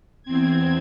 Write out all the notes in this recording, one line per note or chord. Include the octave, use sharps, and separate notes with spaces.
E2 C4 G#6